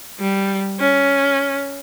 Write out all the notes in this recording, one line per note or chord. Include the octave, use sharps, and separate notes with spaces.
G3
C#4